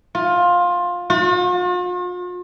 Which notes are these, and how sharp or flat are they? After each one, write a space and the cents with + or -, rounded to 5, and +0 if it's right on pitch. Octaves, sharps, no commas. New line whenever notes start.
F4 +15
F4 +45